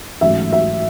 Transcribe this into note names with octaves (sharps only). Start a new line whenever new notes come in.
A1 G#2 F#3 A3 E5
E5